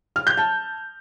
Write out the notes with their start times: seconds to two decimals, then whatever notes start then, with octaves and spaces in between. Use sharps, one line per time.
0.16 F6
0.27 G6
0.37 A5